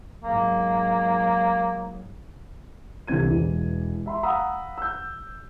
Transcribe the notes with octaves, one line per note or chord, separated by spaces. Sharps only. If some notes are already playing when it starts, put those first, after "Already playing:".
G#2 F#3 A#3
C2 D3 E3 C4 G#6 D#7
E1 E3
E5 B5 C6
F5 F#5 A#5 B5 D#6 E6
E6 G6